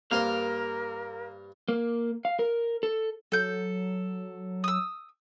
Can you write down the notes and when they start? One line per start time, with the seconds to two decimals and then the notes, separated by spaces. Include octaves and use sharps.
0.11 G2 A#3 A#4 C5 F5 C6
1.69 A#3
2.25 F5
2.39 A#4
2.83 A4
3.32 F#3 A4 G6
4.64 D#6 E6